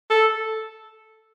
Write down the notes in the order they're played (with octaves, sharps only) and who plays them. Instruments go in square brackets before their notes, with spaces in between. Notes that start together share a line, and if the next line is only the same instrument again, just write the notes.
[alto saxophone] A4